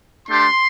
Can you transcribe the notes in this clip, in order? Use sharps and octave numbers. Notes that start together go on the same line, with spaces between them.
A3 D4 G4 C6